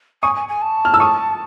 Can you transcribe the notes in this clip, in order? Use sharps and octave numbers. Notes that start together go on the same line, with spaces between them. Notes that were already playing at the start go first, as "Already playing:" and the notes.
G#5 C#6 D#6
G#5
G#5
A5
F6
E6
C#6 D#6